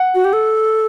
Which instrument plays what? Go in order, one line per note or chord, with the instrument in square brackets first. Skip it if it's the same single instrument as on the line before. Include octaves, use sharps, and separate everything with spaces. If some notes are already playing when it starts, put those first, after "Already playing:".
Already playing: [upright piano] F#5
[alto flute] F#4
G4
A4